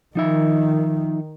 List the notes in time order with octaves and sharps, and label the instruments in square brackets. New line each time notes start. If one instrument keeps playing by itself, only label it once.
[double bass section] D#3 [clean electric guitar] F3 D#4 E5